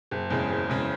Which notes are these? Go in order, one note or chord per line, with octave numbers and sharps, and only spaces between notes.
F#1
E2 C#3 G#3
F#1
E2 C#3 G#3